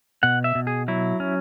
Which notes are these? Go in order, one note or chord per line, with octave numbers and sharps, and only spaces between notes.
B2 F#5
E5
B2
G#4
F#3 E4
C#4